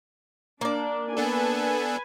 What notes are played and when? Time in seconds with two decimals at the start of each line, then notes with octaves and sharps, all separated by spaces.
0.61 A#3 D4 D5
1.17 B3 D4 A4 B4 G#5